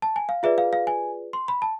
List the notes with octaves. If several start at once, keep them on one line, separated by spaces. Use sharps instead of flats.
A5
G#5
F5
F4 G#4 B4 D5 E5
F5
F5
G#5
C6
B5
A5